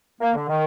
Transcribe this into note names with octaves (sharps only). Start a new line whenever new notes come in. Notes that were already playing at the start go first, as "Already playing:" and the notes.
A#3
D3
D#3